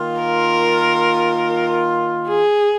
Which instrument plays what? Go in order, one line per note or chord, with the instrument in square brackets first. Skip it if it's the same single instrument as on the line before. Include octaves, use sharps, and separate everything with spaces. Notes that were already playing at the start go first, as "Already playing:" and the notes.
Already playing: [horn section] D#3 A#3 F4
[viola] A#4
G#4